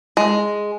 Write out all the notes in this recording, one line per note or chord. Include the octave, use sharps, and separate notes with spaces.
G#3